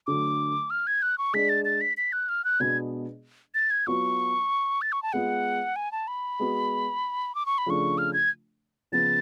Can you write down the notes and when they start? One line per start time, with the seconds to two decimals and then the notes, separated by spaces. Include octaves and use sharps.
0.07 D3 F#3 A3 D6
0.70 F6
0.87 G#6
1.02 F#6
1.18 C#6
1.34 G#3 D4 G#4 D5 B6
1.49 A6
1.65 A6
1.81 B6
1.97 B6
2.13 F#6
2.29 F6
2.45 F#6
2.60 B2 G#3 B3 D4 G#4 G#6
3.55 A6
3.71 G#6
3.87 F#3 B3 F4 C#6
4.82 A6
4.92 C#6
5.03 A5
5.13 G#3 B3 F4 F#5
5.76 G#5
5.92 A5
6.08 B5
6.39 G#3 B3 F#4
7.35 D6
7.46 C#6
7.58 B5
7.66 C#3 F3 A3 D4 F4 C#6
7.98 F6
8.13 G#6
8.92 C#3 F3 B3 A6